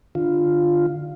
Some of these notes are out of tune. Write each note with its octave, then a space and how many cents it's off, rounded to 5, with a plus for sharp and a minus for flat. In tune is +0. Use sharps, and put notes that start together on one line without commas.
D3 +20 F4 +0